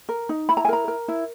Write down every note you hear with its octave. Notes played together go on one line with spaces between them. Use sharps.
A#4
D#4
E4 B5
A#5
G#5
A#4 A#5
A#4
E4